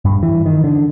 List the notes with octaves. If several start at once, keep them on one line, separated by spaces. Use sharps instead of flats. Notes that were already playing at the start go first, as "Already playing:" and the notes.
G2
E3
D#3
D3